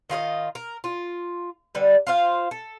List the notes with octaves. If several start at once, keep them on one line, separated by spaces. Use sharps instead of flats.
D#3 F4 G#4 D#5
A#4
F4
D3 G3 B4
F4 C5 F5
A4